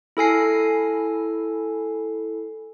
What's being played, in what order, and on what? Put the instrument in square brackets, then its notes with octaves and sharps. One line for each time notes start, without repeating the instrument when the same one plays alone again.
[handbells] E4 A4 G#5 C7